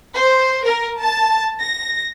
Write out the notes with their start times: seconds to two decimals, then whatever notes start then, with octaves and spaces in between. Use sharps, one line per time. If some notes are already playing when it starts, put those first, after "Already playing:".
0.17 C5
0.64 A#4
0.99 A5
1.60 A#6